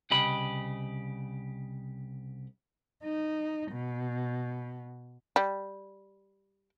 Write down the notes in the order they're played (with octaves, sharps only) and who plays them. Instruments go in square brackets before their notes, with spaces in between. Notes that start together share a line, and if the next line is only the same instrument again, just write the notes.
[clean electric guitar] C2 C#3 G4 D#5 B5
[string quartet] D#4
B2
[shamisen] G3